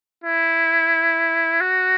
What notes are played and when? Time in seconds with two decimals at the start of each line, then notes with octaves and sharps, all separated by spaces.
0.24 E4
1.61 F#4